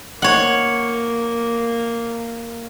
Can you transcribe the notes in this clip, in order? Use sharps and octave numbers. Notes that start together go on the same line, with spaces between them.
A#3 C#5 F#5